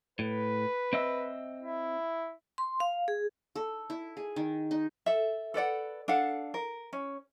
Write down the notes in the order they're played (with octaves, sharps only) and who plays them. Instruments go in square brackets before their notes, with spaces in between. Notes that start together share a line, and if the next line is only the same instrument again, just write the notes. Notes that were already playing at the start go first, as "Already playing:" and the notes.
[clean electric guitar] A2 [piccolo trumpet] B4
[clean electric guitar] C4 D#5 E5
[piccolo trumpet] E4
[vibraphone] C6
F5
G#4
[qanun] A4
E4
G#4
D#3
D#4
[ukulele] A4 E5
A4 B4 D5 F#5
D4 A4 F5 F#5
A#4
C#4